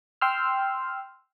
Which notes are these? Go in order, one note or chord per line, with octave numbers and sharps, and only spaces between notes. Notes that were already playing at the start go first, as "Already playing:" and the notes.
G5 C6 E6 F6